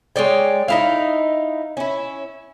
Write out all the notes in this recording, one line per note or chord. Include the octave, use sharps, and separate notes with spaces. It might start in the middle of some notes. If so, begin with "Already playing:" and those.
G#3 C#5 D5 G5
D#4 E4 F5
C#4 E4